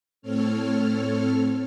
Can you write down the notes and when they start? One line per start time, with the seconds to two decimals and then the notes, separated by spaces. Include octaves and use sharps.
0.22 A2 C4 A4 C#5 F6